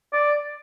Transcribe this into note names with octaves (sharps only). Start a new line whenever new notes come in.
D5